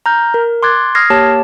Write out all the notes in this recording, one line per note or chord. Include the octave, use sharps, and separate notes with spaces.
A#5 F6 G6
A#4
C6 D6 F#6 G#6 A6
D#6 F6 G#6 A#6 C7
A#3 G4 C#5 A5